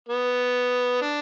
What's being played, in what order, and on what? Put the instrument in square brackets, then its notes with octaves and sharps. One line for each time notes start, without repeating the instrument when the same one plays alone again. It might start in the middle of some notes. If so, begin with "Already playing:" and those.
[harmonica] B3
D4